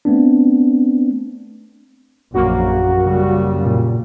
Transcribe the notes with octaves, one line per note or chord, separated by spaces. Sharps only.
A3 B3 C4 D4
A#1 F#2 A#3 F#4
C#3 G3
A#2